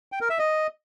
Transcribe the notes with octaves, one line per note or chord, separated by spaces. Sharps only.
G5
A#4
E5
D#5